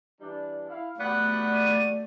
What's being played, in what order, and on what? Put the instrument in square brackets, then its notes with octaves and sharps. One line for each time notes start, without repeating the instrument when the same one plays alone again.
[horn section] E3 G3 D4
E4 F5
[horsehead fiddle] A3 [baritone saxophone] B3 [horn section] F#4 G4 D5 [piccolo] F#6
[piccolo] D#7